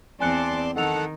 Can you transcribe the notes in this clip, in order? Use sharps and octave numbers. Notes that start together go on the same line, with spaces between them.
E2 C4 D5 G#5 A5 C6 F#6 C#7
D#3 A4 D#5 F#5 A5 F7